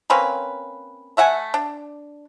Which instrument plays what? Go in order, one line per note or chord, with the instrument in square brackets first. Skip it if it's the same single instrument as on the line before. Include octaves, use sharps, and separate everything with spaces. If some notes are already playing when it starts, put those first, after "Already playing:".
[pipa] A#3 C4 C#4 B4
A3 E5 F#5 G#5
D4